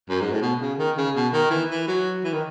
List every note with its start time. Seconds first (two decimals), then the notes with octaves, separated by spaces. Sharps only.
0.09 F#2
0.21 G#2
0.32 A2
0.42 B2
0.61 C#3
0.78 D#3
0.97 C#3
1.15 B2
1.33 D#3
1.51 E3
1.70 E3
1.88 F#3
2.24 E3
2.33 D#3